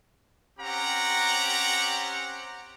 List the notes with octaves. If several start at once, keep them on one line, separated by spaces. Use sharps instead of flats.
C4 C#4 G4 F#5 A#5